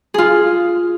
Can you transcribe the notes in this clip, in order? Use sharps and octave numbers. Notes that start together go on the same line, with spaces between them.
F4 G#4